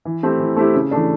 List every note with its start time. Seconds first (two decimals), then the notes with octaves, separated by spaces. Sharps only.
0.05 E3
0.23 A3 C4 E4 G4
0.40 E3
0.56 A3 C4 E4 G4
0.74 C#3
0.91 E3 A3 D4